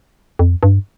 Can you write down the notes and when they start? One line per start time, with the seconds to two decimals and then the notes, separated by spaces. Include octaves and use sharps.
0.39 F2
0.63 G2